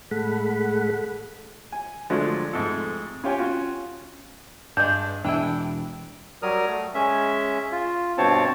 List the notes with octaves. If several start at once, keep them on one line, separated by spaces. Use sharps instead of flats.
A2 G#3 A3 A4 F#5 B5
G#5
D3 F3 F#3 G#3 A3 D4
F2 G#2 C3 A3 A4
C#4 F4 G4 C#5 G5 G#5
C#4 F4 F#4
G2 G#3 D4 G6
E1 E2 E3 D4 E4 G5
F#3 G3 A#4 D#6 F6
A3
G#3 C#4 E5
F4
G2 B2 C4 C#5 A5